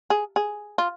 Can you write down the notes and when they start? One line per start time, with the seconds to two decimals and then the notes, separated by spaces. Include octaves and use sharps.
0.10 G#4
0.36 G#4
0.78 F4